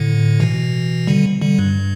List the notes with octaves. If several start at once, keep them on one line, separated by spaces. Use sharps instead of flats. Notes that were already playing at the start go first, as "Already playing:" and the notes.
Already playing: A2 D3
B2 E3
D3 G3
D3 G3
G2